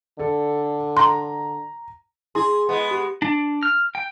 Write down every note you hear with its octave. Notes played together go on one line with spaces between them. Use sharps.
D3 A4
A#5 C6
E4 G#4 C6
G#3 B3
G4
D4
F6
G5